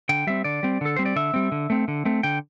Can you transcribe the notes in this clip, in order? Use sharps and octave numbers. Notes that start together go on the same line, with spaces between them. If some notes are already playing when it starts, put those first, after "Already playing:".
D3 G5
G3 C4 E5
D3 D5
G3 C4
D3 A4
G3 C4 C5
D5
D3 E5
G3 C4
D3
A3 C4
D3
A3 C4
D3 G5